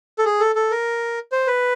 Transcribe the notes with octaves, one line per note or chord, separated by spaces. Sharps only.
A4
G#4
A4
A4
A#4
C5
B4